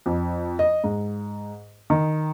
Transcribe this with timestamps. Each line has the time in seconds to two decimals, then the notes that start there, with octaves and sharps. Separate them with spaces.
0.06 F2
0.59 D#5
0.84 G#2
1.90 D#3